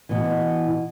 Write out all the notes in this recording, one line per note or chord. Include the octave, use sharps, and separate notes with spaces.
B2 E3